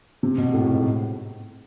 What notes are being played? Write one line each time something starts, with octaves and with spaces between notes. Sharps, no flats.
C3
B2
A2
A2
G#2